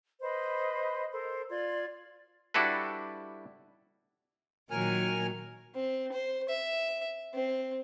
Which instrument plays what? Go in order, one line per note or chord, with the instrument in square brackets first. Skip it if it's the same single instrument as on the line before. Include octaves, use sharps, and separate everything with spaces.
[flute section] B4 C5 D#5 B5
A4 A#4 C5
F4 D5 C6 G#6
[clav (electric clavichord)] G3 D4 E4 F#4 A4 B4
[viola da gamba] A#2 D#3 F#3 [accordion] A#4 G#5 F6
[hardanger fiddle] C4
C5
E5
C4